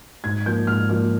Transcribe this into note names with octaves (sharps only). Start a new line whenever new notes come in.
G#2 G#6
F3 A#3 G6
G#2 F6
F3 A#3 F6